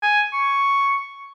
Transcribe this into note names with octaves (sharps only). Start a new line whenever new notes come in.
G#5
C#6